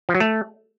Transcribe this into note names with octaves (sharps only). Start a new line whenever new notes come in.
F3
F#3
A3